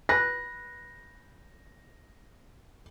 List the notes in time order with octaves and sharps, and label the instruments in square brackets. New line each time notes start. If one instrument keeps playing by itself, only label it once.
[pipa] B4 [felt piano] A#6